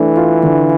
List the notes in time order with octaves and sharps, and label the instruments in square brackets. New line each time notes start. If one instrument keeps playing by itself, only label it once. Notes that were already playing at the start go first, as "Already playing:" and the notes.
Already playing: [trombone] E3 [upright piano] A3 D4
[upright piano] F4
D3